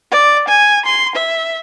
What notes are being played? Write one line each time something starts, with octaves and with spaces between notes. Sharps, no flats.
D5
G#5
C6
E5